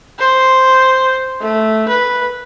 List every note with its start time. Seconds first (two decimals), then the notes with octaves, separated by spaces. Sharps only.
0.19 C5
1.41 A3
1.88 B4